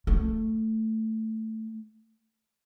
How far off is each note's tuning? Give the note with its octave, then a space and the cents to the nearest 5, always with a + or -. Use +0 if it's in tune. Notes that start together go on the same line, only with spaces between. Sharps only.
A3 +10